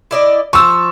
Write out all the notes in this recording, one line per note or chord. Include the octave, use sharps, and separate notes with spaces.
E4 D5 D#5
F3 C#6 E6